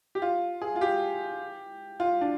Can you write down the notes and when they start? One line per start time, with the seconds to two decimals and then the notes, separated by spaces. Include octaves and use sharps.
0.15 G4
0.22 F4
0.62 G#4
0.76 F4
0.81 G4
2.00 F4
2.21 D4